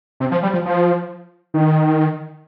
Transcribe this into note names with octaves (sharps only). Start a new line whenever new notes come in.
C3
F3
G3
F3
F3
D#3